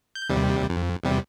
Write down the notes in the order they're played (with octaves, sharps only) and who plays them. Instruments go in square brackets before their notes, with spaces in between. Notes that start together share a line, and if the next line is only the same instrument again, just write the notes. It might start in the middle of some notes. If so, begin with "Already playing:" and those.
[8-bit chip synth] G6
D#2 C3 G3
F2
E2 C3 G3